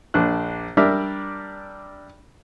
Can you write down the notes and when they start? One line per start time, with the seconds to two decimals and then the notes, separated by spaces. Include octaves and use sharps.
0.14 A#1 D4 C5 F#6
0.77 G3 D4 A#4 D5 E5